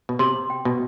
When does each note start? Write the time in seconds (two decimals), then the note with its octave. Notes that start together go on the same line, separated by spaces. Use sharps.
0.09 B2
0.19 C3 C6
0.50 G5
0.65 B2